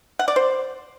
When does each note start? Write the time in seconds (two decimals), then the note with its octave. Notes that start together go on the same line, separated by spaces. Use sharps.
0.19 F#5
0.28 D5
0.36 C5